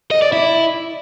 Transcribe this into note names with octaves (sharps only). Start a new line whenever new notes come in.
D#5
D5
E4